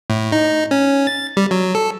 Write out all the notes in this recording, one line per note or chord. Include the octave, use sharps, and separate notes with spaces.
A2
D#4
C#4
A6
G3
F#3
A4